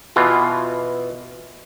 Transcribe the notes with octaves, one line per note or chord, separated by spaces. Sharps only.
B2 E3 F4